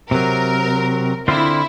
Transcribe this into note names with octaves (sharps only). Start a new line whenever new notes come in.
C3 F#3 A#4
D3 C4 E4 F4